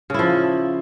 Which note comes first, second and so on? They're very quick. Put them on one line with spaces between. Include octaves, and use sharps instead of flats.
C#3 E4 F3